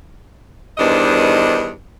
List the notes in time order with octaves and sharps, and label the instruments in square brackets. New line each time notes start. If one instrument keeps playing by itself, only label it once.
[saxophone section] E2 G2 D#3 D4 C5 D#5